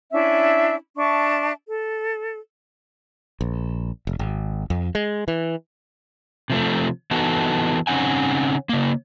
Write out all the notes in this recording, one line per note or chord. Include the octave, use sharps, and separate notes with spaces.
C#4 D4 E4 E5
D4 E5 A5 C#6
A4
A#1
F1
G#1
F2
G#3
E3
C3 F3 A3
E3 B3 D#4 F#4 A4
C#3 C4 C#4 D#4 F#5 G#5
C#3 A#3